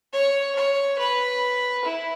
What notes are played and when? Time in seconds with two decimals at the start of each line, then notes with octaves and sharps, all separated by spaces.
0.13 C#5
0.55 C#5
0.99 B4
1.85 E4